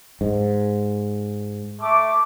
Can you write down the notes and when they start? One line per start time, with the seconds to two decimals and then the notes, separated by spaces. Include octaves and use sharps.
0.21 G#2
1.81 A3 D6